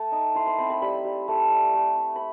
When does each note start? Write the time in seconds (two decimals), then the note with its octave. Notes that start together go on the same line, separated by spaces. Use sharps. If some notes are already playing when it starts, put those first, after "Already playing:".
Already playing: A3 A5
0.12 D#4
0.35 E4 C6
0.47 C6
0.58 C4 B5
0.70 B5
0.81 G3 B5
1.05 G3
1.28 A3
1.50 E4
1.74 A3
1.97 E4
2.16 B5